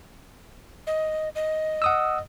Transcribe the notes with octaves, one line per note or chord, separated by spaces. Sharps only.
D#5
D#5
F#5 D#6 E6